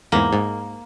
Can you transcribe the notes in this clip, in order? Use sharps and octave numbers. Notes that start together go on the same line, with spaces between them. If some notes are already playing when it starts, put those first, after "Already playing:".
E2 G#2 A#3
G#2